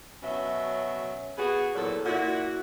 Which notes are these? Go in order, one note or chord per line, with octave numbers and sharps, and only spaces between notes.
B2 F#3 C#4 E5
B3 F#4 G#4
E2 A#2 F#3 A4
A#2 E4 F#4